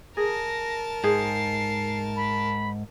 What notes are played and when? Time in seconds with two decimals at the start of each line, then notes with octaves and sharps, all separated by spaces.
0.17 G#4 A#4 A5 A#6
1.04 G#2 G#4 C7
2.16 B5